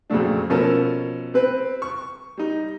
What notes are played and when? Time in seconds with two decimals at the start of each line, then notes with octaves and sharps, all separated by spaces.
0.10 F2 A#2 C#3 F#3 A3 D4
0.50 B2 F3 C#4 A4 A#4
1.34 C4 B4
1.82 C#6
2.37 G3 D#4